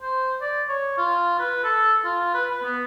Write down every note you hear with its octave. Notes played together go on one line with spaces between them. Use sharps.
C5
D5
C#5
F4
B4
A4
F4
B4
B4
B3